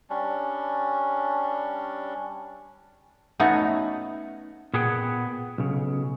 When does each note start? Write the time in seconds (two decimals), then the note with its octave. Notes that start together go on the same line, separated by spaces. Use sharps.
0.10 G3 C#4 D4
3.40 A3 B3 C#4 D#4 F#4
4.74 A#2 B3 G#4 F#5 G5
5.58 B1 C#3